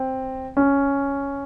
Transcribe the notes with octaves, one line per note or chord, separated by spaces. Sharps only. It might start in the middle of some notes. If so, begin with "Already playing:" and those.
Already playing: C4
C#4